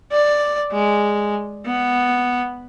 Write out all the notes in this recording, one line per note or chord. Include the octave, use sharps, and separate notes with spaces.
D5
G#3
B3